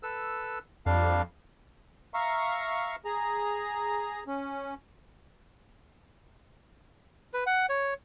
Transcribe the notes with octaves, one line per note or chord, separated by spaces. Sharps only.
A4 B4 E6
F2 G3 D4 F5
E5 F5 A#5 C#6
G#4 A#5
C#4
B4
F#5
C#5